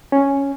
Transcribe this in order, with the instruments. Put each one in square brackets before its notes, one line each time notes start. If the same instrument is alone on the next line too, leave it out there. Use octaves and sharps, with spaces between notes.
[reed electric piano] C#4